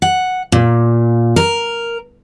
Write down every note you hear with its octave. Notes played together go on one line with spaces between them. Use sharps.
F#5
A#2
A#4